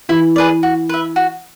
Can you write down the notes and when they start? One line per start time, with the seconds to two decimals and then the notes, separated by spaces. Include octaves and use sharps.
0.09 E3 E4
0.36 G#4 B4 D5
0.63 F#4
0.89 B4 E5
1.16 F#4